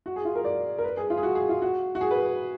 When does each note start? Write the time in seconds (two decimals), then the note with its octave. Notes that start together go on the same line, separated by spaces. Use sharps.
0.06 F#4
0.16 G#4
0.25 F4
0.35 A#4
0.45 D5
0.78 A#4
0.84 B4
0.97 G#4
1.10 F4
1.17 G#4
1.23 F#4
1.35 G#4
1.49 F4
1.62 F#4
1.95 F#4
2.01 G#4
2.11 B4